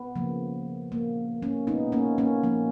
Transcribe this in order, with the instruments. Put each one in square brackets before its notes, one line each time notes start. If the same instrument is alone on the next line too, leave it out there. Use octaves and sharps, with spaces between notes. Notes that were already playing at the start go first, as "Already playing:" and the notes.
Already playing: [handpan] B3
C#3 F3 A#3
A#2 G#3 A#3
A#3 C#4
A#2 G#3 B3 D#4
A#3 C#4
A#3 C#4
A#2 F3 A#3